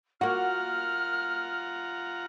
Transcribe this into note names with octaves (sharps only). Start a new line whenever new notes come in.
A#3 F4 F#4 F#5 A#5 F6